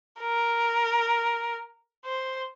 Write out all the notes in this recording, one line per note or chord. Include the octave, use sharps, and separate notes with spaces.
A#4
C5